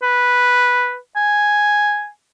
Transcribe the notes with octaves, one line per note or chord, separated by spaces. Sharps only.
B4
G#5